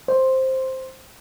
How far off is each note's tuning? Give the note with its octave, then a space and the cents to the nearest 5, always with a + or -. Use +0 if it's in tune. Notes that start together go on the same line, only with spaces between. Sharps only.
C5 +5